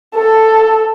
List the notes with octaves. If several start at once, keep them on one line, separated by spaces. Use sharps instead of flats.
A4